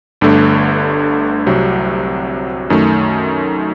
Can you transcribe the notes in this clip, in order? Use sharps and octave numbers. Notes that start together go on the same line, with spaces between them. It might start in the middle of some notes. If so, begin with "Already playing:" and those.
G1 G2 D3 A3
C2 C3 F#3
F#2 D#3 A3